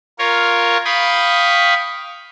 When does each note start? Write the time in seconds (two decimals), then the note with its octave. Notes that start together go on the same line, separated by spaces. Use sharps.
0.19 F4 A#4 C#5
0.85 F5 G5 B5 C#6 D#6